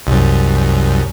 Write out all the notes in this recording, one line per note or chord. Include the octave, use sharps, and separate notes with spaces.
C2 F#2